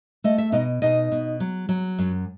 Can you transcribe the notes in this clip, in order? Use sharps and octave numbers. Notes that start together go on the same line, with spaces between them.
A3 D#5
E5
B2 D#4 D#5
B2 D#4 D#5
B2
F#3
F#3
F#2